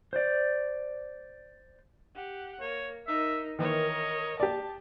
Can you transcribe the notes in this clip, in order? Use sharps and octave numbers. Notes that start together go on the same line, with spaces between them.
C5 D5
G4 F#5
A#3 C#5
D#4 A#4 E5
D#3 E3 A#4 C#5 D#5
G4 D5 A5